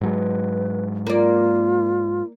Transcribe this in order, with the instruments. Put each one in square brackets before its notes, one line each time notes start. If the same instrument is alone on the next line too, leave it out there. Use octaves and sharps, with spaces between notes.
[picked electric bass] G#2 F#3 G#3 [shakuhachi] B4
[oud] A#3 D5 [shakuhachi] F4